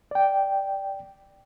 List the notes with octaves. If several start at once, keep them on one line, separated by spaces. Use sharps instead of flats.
D5 G5